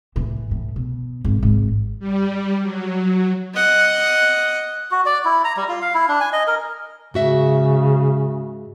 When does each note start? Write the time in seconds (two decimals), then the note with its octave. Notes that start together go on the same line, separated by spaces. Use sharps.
0.16 A2 E3
0.51 A2
0.76 B2
1.24 G#1 F#2
1.43 G#1 E3
2.00 G3
2.62 F#3
3.54 D#5 F#5
4.91 F#4
5.06 D5
5.25 E4
5.44 A#5
5.57 G3
5.69 F4
5.82 F5
5.94 E4
6.08 D4
6.20 G#5
6.33 D#5
6.47 A#4
7.14 G#2 C#3 F#4 E5